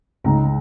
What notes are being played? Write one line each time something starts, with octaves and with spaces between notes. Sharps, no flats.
C#2 C#3 G#3 D#4 A#5